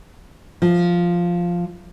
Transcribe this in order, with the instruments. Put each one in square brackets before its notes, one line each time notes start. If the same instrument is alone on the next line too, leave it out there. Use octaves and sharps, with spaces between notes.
[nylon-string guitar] F3